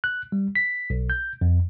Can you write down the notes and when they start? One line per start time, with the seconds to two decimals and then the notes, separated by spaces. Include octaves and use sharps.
0.04 F#6
0.32 G3
0.55 B6
0.90 B1
1.10 G6
1.41 F2